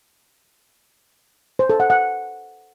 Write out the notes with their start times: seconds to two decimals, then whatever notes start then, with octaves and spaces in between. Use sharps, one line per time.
1.59 C5
1.70 A4
1.80 F#5
1.90 F#5